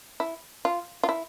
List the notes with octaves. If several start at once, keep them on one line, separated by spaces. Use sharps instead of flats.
E4
F4
F4
E4